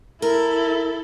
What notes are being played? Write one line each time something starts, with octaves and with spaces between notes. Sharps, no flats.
E4 A4 A#4